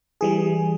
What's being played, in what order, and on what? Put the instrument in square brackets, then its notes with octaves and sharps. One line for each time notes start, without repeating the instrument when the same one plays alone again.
[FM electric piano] E3 G3 G#4